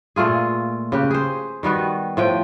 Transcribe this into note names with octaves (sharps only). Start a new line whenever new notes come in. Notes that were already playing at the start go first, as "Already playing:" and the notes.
A#2 A3 F4 G#4
C#3 G4 B4
G#4 C5
D#3 G3 B3 F#4
A2 F3 G5